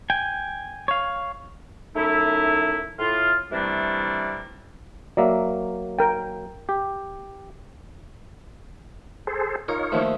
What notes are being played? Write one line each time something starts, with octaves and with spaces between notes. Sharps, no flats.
G5 G#5
C#5 F5
F#2 A3 D#4 E4
A2 F4
C3 E3 G3 A3 A#3 D4
F#3 A#3 D5 E5
A#4 G5
G4
G#4 A4 C5
D#4 F4 A#4 C#5
D#2 F3 A3